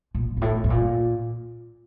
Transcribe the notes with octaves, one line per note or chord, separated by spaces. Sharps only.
A#2
G2
A2
A2
A#2